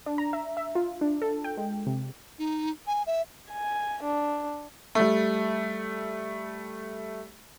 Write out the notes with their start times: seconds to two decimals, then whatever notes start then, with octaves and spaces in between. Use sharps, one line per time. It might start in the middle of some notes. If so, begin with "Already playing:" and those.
0.06 D4
0.18 A#5
0.33 E5
0.57 E5
0.75 F4
1.01 D4
1.22 A4
1.44 G5
1.57 G#3
1.86 C3
2.39 D#4
2.87 G#5
3.07 E5
3.52 G#5
4.04 D4
4.95 G3 A3